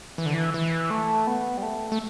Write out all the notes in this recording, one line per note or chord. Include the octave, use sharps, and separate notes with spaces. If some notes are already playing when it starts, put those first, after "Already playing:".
E3
D3
E3
E3
A3
B3
G3
A3
A3